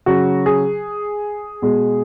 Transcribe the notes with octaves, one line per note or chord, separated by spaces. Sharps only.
C#3 F#3 F#4
G#4
B2 G#3